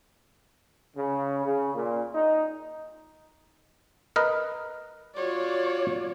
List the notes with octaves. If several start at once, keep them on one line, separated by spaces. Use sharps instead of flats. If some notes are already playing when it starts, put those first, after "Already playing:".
C#3
C#3
A#2
D#4
A#4 B4 D#5
F4 F#4 C#5 D5